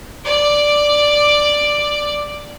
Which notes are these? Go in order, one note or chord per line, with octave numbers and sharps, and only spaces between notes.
D5 D6